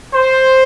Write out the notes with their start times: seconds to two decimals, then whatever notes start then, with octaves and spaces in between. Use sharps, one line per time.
0.13 C5